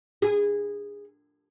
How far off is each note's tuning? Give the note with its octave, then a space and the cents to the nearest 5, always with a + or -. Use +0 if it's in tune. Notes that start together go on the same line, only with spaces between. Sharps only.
G#4 -20